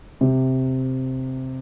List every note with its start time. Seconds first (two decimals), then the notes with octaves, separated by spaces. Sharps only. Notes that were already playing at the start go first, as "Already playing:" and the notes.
0.21 C3